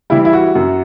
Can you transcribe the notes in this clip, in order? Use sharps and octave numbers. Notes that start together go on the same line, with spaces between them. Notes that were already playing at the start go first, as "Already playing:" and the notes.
E3 G3 E4
E4
F#4
F#2